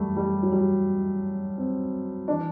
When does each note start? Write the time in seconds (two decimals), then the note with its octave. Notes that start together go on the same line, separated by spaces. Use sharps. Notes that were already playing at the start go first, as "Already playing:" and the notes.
Already playing: F#2 E3 G3 A3
0.16 G3
0.43 F#3
0.52 G3
1.58 C4
2.28 E3 D4